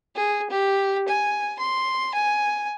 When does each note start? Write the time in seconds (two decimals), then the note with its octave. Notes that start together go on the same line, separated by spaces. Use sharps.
0.15 G#4
0.50 G4
1.08 G#5
1.59 C6
2.14 G#5